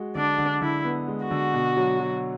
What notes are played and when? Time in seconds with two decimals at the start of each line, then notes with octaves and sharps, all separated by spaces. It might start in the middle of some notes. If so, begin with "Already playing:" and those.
Already playing: G#3 F#4
0.15 D3 D4
0.38 D3
0.61 D3 E4
0.85 B3
1.08 G#3
1.23 F#4
1.31 D3
1.54 B2
1.77 F#3
2.00 F#3